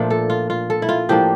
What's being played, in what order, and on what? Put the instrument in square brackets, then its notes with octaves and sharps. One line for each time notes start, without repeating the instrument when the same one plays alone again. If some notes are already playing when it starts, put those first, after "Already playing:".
Already playing: [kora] A#2 F3 A3 D4 C5
A4
F4
F4
A4
E4
F4
A2 F3 A#3 D4 G4